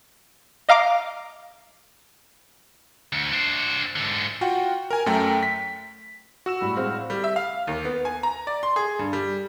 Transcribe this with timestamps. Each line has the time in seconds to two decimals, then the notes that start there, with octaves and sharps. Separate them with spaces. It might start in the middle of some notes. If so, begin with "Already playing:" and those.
0.69 D#5 F5 A#5 D6 F6
3.13 D2
3.32 D4 C5
3.96 G#2 D3
4.41 F4 F#4 F#5 G5
4.91 A#4 G#5
5.06 F#2 A3 G5 A#5
5.43 B6
6.46 F#4 E6 E7
6.61 A2 G3 B5
6.76 G#3 C4 F5
7.10 G3
7.24 E5
7.36 F5
7.67 D#2
7.85 B3
8.05 G#5
8.23 A#5
8.47 D5
8.63 C6
8.76 G#4
8.99 G2
9.13 G3